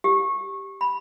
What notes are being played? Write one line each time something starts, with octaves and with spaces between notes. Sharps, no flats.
G4
B5